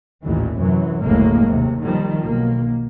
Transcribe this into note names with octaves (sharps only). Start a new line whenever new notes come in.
A1 D#2 A#2 E3
F#2 C3 E3 F#3
F#1 D2 A2 G#3 A#3
D#2 C3
D#3 F3 G3
B1 A#3